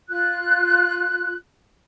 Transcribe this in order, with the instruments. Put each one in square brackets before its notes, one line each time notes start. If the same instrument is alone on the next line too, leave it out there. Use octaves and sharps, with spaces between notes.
[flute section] F4 F#6